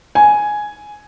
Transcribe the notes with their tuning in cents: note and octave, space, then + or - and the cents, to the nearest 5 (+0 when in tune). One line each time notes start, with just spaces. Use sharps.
G#5 +5